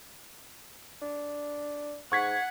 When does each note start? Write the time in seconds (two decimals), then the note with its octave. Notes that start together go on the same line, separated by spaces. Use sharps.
1.02 D4
2.12 G#2 F#5 C#6 G#6 B6